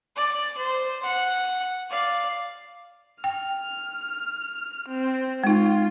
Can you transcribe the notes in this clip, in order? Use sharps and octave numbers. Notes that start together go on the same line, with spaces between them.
D5
C5
F#5
D5 F5
G5 F6
C4
G#3 D#4 F4